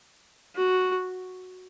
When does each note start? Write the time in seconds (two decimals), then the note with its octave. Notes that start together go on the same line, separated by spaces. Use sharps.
0.56 F#4